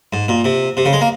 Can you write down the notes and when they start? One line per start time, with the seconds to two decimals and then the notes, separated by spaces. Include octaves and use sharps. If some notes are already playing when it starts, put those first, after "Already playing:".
0.13 G#2
0.28 A#2
0.45 C3
0.77 C3
0.85 C#3
0.93 G#3
1.01 A#3